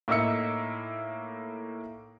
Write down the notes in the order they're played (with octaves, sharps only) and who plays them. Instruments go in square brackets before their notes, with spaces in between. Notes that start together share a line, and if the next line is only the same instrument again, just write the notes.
[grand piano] A2 A#3 D#4 E5 E6 C#7